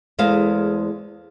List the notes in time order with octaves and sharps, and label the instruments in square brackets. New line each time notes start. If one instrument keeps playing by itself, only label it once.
[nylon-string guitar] E2 G#3 A3 C5 F5